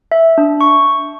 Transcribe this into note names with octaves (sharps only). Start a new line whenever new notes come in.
E5
D4
C#6